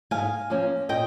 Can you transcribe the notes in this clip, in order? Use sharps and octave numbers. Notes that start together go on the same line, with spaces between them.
G#2 F5 G#5
F3 A#3 C#4
A#2 D#5 G5